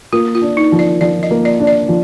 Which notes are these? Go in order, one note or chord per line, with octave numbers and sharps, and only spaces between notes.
A#3 F4
F4
D4
D#4
F3
D5
F3 D5
D#5
A#3
D5
D4
D5
F3